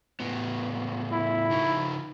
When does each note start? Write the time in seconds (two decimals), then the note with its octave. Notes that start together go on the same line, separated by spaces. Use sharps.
0.20 A2 B3
1.12 E4
1.50 C#3 F3 D#4